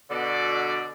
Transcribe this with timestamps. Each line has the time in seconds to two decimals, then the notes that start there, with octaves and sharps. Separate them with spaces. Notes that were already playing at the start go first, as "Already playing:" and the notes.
0.11 B2 D3 D5